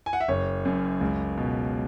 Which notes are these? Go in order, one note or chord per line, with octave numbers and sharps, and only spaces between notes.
G#5
F#5
E5
F#1 C#5
F#2
C#2
B2